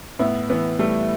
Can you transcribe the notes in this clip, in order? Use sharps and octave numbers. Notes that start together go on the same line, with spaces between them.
A2 B3 E4
E3 B3
G3 A3